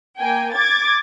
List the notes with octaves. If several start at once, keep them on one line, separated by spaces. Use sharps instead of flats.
A#3 G5 G#5
D6 G#6 A6